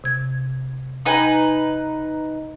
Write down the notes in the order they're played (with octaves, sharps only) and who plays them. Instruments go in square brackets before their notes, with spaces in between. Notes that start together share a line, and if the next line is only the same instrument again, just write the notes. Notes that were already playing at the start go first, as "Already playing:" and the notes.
[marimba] C3 G#6
[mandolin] D#4 B4 G#5